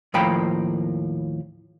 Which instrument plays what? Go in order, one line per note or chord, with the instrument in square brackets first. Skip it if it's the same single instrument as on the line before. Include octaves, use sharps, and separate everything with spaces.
[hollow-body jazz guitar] D#2 A2 F3 A#3 G5 B5